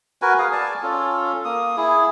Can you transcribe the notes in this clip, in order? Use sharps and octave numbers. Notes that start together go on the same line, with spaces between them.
F#4 A#4 B4 G#5
G#4 F5
D5 G#5 A5
C#4 F4 A4
A#3 D#6
E4 G#4